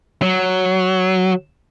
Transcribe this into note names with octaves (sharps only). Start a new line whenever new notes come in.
F#3